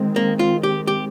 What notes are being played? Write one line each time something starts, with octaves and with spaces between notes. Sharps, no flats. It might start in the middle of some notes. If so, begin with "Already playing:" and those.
Already playing: D#3 G#3 C4
A#3
F4
G4
G4